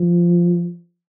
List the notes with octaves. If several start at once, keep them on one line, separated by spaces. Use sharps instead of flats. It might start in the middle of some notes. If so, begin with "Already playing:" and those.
Already playing: F3